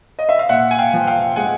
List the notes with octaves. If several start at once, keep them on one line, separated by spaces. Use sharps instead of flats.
D#5
E5
F5
A#2 E5 F#5
G#5
F5 G5
F3
F5 G5
G#3 F#5 G#5